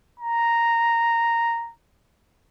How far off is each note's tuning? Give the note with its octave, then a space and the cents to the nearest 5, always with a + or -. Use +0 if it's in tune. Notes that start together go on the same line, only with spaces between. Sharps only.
A#5 -5